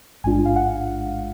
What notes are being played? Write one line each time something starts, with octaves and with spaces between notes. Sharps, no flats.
A1 G#2 G#3 D4 F4 G#5
F5
F#5